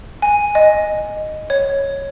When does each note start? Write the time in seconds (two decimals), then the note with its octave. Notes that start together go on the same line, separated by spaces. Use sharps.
0.22 G#5
0.55 D#5
1.50 C#5